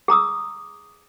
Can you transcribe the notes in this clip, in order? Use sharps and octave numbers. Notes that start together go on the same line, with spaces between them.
G#4 A#5 D#6 E6